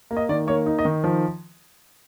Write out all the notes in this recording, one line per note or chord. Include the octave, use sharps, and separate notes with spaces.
A#3
D#5
D#3 D5
A#3 C#5
D#4
D#5
D#3
F3